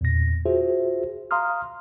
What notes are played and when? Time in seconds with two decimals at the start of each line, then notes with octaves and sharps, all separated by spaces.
0.01 E2 A#2 A#6
0.46 F4 F#4 G#4 C5 E5
1.31 F5 A#5 C6 D#6 F6